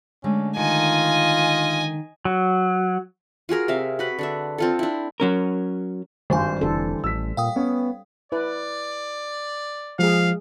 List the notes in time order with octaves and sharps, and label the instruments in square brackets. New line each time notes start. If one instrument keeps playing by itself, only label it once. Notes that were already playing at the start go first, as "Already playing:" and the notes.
[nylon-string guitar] D3 G#3 A3 [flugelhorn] C#4
[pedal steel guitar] D#3 [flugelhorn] F4 [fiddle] D#5 G#5
[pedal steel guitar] F#3
[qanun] F4 F#4 G#4 A#4
C3 E5 F5
F#4 B4 B5
D3 D4 E5
C4 F4 A4
D4 E4
[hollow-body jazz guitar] F#3 C#4 A#4
[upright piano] G#1 G2 [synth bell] D#3 G#5 [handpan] G3 C5
[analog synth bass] F1 [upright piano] D3 E3 [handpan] A4
[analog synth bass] A1 [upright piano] E6 B6
[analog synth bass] A#2 [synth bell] F5 G5 D#6
[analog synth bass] B3 [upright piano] C#4
[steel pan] E4 B4 [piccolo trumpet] D5
[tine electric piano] F3 [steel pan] G#3 G#4 [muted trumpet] F5